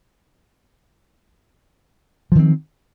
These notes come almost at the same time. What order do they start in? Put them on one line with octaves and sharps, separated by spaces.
F3 D#3 C4